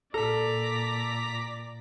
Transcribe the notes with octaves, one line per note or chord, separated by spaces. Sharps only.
A#2 A4 D5 A#5 B6